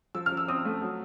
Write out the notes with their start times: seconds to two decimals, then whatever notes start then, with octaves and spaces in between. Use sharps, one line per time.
0.15 F3 E6
0.26 F6
0.32 F3
0.37 E6
0.48 C4 D#6
0.65 A3
0.82 F#3